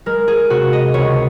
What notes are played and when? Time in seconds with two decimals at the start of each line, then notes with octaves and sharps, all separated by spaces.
0.06 G#3 A#4
0.28 G#4
0.50 C3 F#4
0.73 D#5
0.94 C#2 C#5